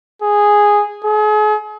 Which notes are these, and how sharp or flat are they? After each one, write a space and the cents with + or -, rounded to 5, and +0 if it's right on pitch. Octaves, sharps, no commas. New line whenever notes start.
G#4 -5
G#4 +40